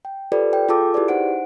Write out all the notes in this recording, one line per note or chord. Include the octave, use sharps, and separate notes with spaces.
G5
F4 G4 A4 B4 C5 D5
G5
F4 G#4 A4 A5 D6 E6
E4 G4 G#4 B4 D5
D#4 C5 F#5 D7